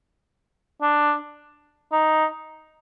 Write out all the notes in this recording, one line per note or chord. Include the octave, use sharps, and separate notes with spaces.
D4
D#4